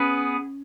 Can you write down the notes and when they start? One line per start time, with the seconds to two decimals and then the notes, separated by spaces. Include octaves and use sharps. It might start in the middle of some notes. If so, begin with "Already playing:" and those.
Already playing: B3 C#4 G#4 B4